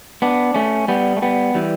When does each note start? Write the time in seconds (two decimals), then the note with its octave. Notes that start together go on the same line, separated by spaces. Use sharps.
0.22 B3 D4
0.55 A3 C#4
0.88 G3 B3
1.17 A3
1.22 G3 B3
1.55 E3 G3